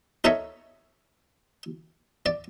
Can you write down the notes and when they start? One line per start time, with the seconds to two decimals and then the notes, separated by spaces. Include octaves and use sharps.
0.24 D#4 A4 A#4 C#5 E5
2.26 D5